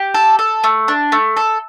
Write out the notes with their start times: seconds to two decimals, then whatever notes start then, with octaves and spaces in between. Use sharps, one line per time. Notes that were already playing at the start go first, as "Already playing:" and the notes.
Already playing: G4
0.14 A4
0.39 A4
0.64 A3
0.88 D4
1.12 A3
1.37 A4